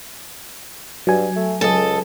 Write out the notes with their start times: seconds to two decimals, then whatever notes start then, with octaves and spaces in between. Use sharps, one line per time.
1.07 G2 F#3 G#5
1.36 A3
1.61 C#2 A4 D#5